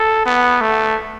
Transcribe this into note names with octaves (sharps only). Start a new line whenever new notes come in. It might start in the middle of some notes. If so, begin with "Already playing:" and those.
Already playing: A4
B3
A3